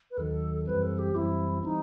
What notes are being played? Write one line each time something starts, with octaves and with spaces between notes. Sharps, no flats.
B4
D#2 D#3 F#3 A4
F#2 E3 G3 C4 B4
A4
G4
F#2 E3 G3 C4 E4
E3 G3 C4 D#4